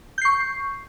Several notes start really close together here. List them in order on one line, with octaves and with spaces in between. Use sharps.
G6 C7 C#6